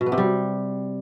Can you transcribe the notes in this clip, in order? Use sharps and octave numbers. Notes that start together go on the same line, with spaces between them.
B2
B3
C3
G3